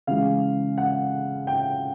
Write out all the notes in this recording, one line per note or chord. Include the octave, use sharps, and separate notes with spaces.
C#3 E3 G#3 F5
F#5
G5